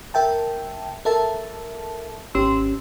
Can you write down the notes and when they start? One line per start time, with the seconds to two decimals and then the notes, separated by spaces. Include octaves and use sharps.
0.14 A#4 E5 G5 A5
1.05 A4 A#4 E5 A5
2.35 G#1 C#4 G4 C6 E6